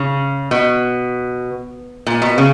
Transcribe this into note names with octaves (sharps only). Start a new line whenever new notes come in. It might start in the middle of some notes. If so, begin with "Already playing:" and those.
Already playing: C#3
B2
A#2
B2
C#3